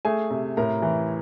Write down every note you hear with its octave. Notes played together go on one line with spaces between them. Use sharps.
A3 G#4 G#5
C3
A2 A#4 A#5
E3